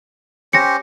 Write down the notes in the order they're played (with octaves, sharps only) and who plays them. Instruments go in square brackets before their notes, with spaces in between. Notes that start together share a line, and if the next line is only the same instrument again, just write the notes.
[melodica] C#4 G4 C5 [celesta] A#6 C#7